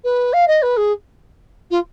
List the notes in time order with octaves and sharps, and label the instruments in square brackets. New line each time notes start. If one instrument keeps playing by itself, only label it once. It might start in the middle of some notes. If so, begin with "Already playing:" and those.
[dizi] B4
F5
D#5
B4
G#4
F4